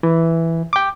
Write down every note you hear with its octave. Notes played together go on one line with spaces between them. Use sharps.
E3
G5 D6